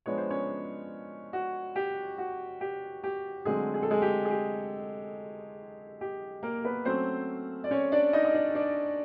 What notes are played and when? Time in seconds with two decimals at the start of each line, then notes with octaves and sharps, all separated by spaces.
0.06 F3 G#3 B3 D4 C#5
0.17 C5
0.30 C#4 C#5
1.33 F#4
1.76 G4
2.18 F#4
2.61 G4
3.04 G4
3.45 D3 F#3 G#3 A3 C4 G#4
3.74 G#4
3.83 A4
3.90 G#3 G#4
4.02 G4
4.25 G#4
4.31 G4
6.01 G4
6.43 A#3 A#4
6.64 B3 B4
6.85 F#3 A3 C4 C#4 C5
7.64 D5
7.71 C#4 C#5
7.92 D4 D5
8.13 D#4 D#5
8.25 D#5
8.34 D4 D5
8.55 D4 D5